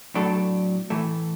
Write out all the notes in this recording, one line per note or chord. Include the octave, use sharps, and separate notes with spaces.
A2 F#3 D4 A4
A2 E3 A3